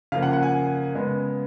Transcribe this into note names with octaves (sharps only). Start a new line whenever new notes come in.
C#3 F3 A#3 F5
F#5
F#5
G#5
C#3 G#3 B3